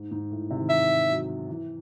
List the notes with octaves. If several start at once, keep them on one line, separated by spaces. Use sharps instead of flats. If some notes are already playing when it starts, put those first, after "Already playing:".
Already playing: G#2
G#2
A2
C3
D#3
E3 E5
F#3
E3